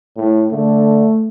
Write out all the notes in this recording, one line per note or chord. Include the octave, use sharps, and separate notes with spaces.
A2
D3 A3